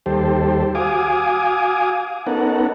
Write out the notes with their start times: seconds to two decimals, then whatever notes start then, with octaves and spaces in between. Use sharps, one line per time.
0.06 D#2 G3 G4 A4 C5
0.75 F#4 F5 G#5 D6 D#6
2.27 B3 C#4 D#4 A4 A#4 F#5